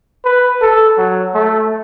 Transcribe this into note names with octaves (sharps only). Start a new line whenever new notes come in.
B4
A4
F#3
A3